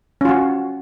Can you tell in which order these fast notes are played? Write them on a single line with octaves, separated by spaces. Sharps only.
C#4 F4 F#4